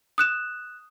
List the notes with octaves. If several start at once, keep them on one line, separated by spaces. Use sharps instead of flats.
D#6 F#6 E7